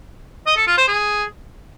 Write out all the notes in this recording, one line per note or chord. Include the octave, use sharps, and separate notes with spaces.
D#5
A4
F4
C5
G#4